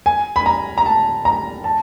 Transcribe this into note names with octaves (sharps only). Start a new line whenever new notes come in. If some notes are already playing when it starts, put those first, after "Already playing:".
G#5
B5
A#5
A#5
A5
A#5
A5